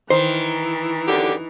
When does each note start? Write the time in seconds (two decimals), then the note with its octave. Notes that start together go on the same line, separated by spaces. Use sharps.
0.10 D#3 E3 C5
1.08 F#2 D3 G4